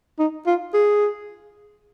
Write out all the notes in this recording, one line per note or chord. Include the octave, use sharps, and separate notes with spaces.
D#4
F4
G#4